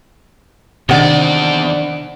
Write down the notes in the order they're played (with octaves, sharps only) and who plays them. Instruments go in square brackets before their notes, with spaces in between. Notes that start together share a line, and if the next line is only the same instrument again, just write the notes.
[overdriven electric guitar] E2 D5 [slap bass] C3 [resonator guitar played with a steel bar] D#3 F#5 [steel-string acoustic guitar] C4 D4